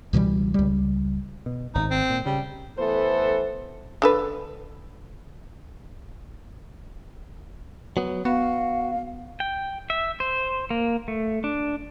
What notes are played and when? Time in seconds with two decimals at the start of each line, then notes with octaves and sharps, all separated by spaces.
0.13 C#2 B2 E3 G3
0.54 C#2 G3
1.46 B2
1.75 G#1 D#4
1.91 C4
2.10 A#2
2.26 C#3 G3
2.78 E3 A3 B3 A4 B4 C5
4.02 D3 A4 B4
7.97 F#3 B3
8.25 B3 F#4 F5
9.40 G5
9.90 E5
10.20 C5
10.70 A#3
11.08 A3
11.44 D4